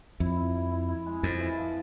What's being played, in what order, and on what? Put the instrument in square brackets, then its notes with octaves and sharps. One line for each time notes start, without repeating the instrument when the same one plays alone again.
[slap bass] F2 [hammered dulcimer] E4
[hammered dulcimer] E4
E4
E4
E4
G#3
[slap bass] F2 [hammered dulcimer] G#3
[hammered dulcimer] E3
F3